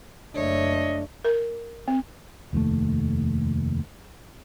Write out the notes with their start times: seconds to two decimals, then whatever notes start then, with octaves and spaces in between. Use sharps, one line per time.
0.35 F#1 A3 D4 C#5 D#5
1.25 A#4
1.88 C4
2.53 F1 D#2 A2 A3